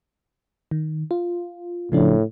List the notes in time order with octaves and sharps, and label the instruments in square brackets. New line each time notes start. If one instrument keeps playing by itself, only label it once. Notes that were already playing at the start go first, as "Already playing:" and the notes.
[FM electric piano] D#3
F4
[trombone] A2 [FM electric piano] C#3 F3 D4